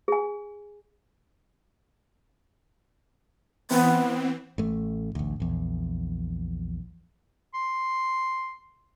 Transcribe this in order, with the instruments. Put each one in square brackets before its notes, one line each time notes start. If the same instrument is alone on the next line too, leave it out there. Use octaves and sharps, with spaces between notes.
[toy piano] G#4 G#5
[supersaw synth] E3 C4 [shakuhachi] B3
[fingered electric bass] A1 A3
A1 D2
A#1 E2
[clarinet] C6